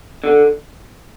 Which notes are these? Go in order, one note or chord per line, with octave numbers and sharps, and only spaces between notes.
D3